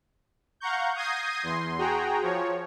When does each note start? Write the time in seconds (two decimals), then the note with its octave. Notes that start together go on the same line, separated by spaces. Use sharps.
0.60 F5 F#5 A#5 C#6 G6
0.96 D#6 G6 G#6 A#6 C7 D#7
1.43 E2 C6
1.78 F#4 G#4 G5 A#5
2.22 F3 C#5